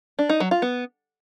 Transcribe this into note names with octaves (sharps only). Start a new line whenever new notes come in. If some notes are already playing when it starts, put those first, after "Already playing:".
D4
D#4
F#3
F4
B3